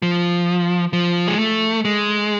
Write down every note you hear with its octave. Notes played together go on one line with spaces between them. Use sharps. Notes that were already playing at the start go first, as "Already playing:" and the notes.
F3
F3
G#3
A3
G#3